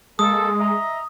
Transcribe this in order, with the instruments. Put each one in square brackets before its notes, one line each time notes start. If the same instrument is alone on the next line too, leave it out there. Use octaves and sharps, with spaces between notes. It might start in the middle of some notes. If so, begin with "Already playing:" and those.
[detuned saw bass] G#3 [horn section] A#3 A4 [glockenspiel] D#6
[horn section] D#5 E5 A#5